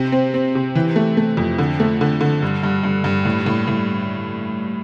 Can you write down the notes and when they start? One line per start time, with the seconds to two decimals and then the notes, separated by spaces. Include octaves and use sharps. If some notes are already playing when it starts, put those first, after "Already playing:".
Already playing: C3
0.12 C4
0.34 C4
0.55 C3
0.75 E3
0.96 A3
1.17 A3
1.37 F2
1.58 D3
1.80 A3
2.01 D3
2.21 D3
2.42 G2
2.63 G2
2.83 G2
3.04 G2
3.25 A2
3.46 A2
3.68 A2